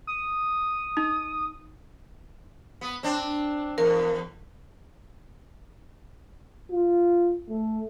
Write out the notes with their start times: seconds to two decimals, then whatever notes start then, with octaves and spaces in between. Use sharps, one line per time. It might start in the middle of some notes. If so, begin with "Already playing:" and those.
0.07 D#6
0.97 D#4
2.81 B3
3.03 C4 D4
3.78 E2 A#4
6.72 F4
7.50 A3